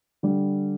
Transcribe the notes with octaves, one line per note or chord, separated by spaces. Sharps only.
D3 G3